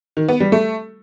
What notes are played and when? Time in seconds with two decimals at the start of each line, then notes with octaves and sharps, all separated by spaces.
0.17 D#3
0.28 B3
0.40 G3
0.52 A3